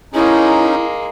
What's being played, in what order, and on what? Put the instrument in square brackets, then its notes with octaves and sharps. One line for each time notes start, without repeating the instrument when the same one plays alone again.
[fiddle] G#3 A#3 [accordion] C#4 D#4 [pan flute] E4